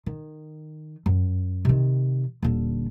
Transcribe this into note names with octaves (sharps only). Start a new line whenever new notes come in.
D#3
F#2
C3 D#3
D#1 D3